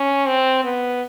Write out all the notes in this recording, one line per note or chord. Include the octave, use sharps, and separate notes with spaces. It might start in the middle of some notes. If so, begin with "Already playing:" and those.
Already playing: C#4
C4
B3